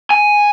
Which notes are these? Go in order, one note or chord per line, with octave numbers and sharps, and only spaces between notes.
G#5